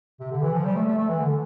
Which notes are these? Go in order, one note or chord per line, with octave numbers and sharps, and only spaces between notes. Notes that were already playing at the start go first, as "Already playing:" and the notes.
C3
D3
E3
F3
G3
A3
A3
A3
E3
D3